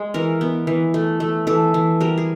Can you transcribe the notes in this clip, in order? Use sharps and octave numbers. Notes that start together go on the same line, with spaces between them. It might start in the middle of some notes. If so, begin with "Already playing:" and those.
Already playing: G#3
E3 A#4
B3
E3
A3
A3
E3 A4
E3
G3 A#4
G#4